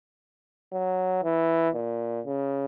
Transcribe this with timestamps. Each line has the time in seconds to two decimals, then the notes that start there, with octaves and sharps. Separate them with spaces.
0.73 F#3
1.23 E3
1.75 A#2
2.26 C#3